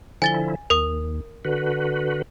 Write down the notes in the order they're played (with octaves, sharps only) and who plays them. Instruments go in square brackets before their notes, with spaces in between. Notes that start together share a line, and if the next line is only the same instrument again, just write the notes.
[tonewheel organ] D3 F3 E4 [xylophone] G#5 A6 G7
[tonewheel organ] D#2 [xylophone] A#4 D#6
[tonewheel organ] D3 F#4 B4